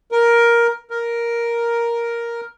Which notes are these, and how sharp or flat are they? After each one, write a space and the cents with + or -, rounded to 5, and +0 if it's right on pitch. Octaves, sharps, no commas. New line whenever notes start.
A#4 +10
A#4 +5